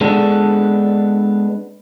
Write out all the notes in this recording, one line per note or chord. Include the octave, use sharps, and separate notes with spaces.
G#3 B3 D4 A4